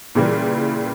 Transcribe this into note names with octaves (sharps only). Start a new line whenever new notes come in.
A#2 C#3 E3 G3 A#3